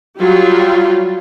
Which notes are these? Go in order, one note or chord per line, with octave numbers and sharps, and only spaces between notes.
F#3 G3 F4 G4